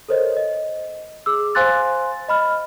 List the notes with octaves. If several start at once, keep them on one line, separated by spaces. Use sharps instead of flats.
A4 A#4 C5 C#5 D#5
D#5
G#4 D6 E6
C5 F5 G#5 C6 F#6 A6
D#5 B5 F6